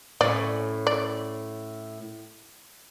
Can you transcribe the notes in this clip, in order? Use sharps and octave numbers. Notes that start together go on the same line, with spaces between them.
A2 C#4 D5
D5